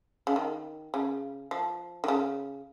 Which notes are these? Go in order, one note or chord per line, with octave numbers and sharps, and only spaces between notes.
C#3
D#3
C#3
F3
D#3
C#3